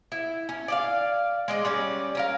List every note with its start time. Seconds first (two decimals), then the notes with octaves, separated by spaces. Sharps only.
0.12 E4
0.49 C#4
0.68 D5 D#5 F5
1.48 G#3 D5 D#5
1.65 G3 C#4 D5
2.15 C#4 A#4 F5